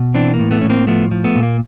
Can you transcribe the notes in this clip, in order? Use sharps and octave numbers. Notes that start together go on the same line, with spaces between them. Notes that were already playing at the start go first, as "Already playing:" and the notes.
Already playing: B2
E3 C4 D4
A#3
A2
A3 B3
A2 C#4
A#3 C4
F3 A3 B3
F3
A3 B3
A#2
A#3